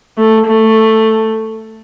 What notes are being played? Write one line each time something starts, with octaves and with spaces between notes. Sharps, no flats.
A3
A3